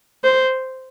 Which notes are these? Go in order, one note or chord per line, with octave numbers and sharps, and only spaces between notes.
C5